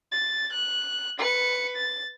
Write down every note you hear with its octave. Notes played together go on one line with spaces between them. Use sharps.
A6
F#6
B4 C#7
A6